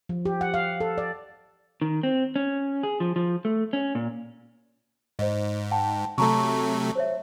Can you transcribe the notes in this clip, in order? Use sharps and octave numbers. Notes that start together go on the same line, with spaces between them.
F3
G4
F#5
F5
A4
D5
D#3
C4
C#4
G#4
F3
F3
A3
C#4
A#2
G#2 C5 D#5
F#5 G5 A5
C3 F#3 A3 A5 A#5 C#6
C5 C#5 E5